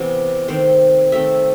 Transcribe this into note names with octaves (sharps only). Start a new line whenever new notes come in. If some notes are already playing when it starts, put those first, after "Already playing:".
Already playing: C3 E3 B3
D#3 A3 C4 C5
D#3 A3 C4 E5